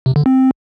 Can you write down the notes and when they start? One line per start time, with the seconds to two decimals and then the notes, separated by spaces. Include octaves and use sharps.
0.06 C3
0.16 D3
0.26 C4